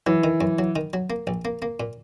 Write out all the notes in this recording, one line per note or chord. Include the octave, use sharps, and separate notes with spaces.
E3 F#3
D#3
F#2
F#3
D#3
F#3
A#3
A#1
A#3
A#3
A#2